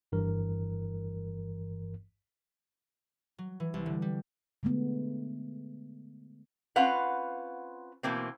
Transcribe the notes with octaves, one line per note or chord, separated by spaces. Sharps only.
G1 G2 E3 A#4
F#3
E3
C2
D3
G3
D3 G#3 A3 B3
C4 C#4 F4 B4 F5 F#5
B2 E3 A#3 C4